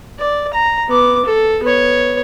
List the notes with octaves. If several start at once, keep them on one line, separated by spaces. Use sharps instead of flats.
D5
A#5
B3 D6
A4
B3 C#5